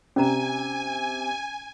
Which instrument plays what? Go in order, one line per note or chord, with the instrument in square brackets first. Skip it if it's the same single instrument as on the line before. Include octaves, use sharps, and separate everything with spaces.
[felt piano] C3 [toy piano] C#4 D5 A#5 [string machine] G#5